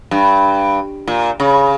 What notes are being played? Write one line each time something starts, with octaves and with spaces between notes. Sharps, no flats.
G2
A#2
C#3